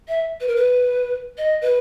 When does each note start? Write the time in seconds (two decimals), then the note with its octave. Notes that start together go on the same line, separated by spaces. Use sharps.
0.08 E5
0.41 B4
0.48 A#4
0.55 B4
1.38 D#5
1.62 B4